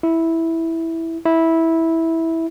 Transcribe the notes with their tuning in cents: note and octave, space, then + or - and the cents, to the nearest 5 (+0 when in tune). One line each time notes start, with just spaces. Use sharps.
E4 -5
E4 -10